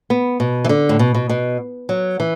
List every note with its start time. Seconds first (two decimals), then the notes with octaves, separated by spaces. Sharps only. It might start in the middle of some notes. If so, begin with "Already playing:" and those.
0.10 B3
0.40 B2
0.64 E3
0.69 D3
0.89 A2
0.99 B2
1.14 B2
1.29 B2
1.89 F#3
2.20 E3